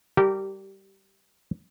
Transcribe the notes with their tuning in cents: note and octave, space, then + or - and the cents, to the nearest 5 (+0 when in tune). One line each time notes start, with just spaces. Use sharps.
G3 +0 G4 -20 A#4 -25